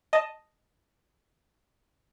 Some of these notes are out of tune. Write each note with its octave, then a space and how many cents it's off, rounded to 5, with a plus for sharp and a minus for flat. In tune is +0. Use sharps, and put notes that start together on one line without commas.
D#5 +0 A5 +0